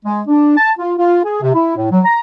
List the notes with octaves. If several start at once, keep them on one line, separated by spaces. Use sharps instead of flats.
G#3
D4
A5
F4
F4
G#4
C3
E4
A2
F#3
A#5